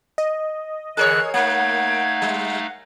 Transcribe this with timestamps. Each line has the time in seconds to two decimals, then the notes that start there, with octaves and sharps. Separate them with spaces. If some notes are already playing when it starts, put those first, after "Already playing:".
0.18 D#5
0.97 D3 E3 G#4 A#4 C#5 F#6
1.34 A3 A#3 D#4 F5 F#5 G#6
2.22 G3